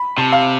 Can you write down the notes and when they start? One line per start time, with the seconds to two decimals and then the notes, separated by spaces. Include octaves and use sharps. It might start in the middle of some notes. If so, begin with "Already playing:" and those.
Already playing: B5
0.18 C3 A5
0.32 F5